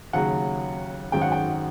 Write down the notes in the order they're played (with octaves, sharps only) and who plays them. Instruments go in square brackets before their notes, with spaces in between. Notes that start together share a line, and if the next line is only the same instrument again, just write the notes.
[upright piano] D#2 C#3 F#3 F#5
G#1 F#2 D#3 G#3 C#4 G5
F#5
G5